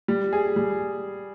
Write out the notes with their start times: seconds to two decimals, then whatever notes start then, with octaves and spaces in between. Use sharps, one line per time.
0.08 G3
0.33 G#4
0.56 G3